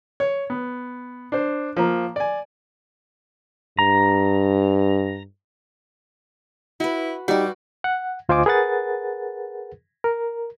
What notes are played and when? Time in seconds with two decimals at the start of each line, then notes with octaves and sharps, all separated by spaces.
0.20 C#5
0.50 B3
1.32 D4 C5
1.77 F3 A#3
2.16 D5 G#5
3.79 G2 A#5
6.80 E4 F#4 B4
7.28 G3 D#4 F#4 G4 D5
7.84 F#5
8.29 D2 F4 C5 D#5 G#5 D6
8.46 G#4 A#4 B4 F#5 A6
10.04 A#4